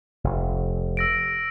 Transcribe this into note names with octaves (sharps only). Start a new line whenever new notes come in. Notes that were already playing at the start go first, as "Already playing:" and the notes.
F1
E6 A#6 D7